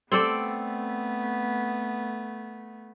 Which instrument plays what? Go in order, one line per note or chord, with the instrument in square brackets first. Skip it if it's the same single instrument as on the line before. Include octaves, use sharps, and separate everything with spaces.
[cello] A3 B3 [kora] C4 A4 D5